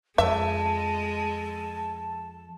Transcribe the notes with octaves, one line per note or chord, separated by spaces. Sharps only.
F2 G#3 E5 A5